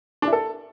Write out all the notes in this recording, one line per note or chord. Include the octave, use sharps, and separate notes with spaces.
D4
E4
A4